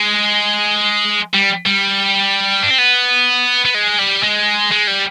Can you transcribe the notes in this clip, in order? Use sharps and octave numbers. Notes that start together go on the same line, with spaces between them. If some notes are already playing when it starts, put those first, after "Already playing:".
Already playing: G#3
G3
G3
D4
C4
B3
B3
G#3
G3
G#3
G#3
G3